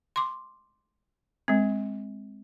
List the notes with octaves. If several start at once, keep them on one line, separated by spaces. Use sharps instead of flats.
C6 D6
G#3 C4